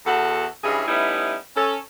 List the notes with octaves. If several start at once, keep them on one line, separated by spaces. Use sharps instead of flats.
E2 F#4 A4
G2 E3 G#3 C#4 E4 G#4
G3 A3 B3 C#4 D#4 E4
C#4 A4